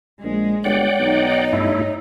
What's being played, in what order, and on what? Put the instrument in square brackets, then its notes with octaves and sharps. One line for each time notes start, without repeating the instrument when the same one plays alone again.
[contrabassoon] A#1 [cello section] G#3
[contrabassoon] G1 [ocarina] C#5 [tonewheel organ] D5 F#5 G5
[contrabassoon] B1 [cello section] D#4
[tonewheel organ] G2 A3 E4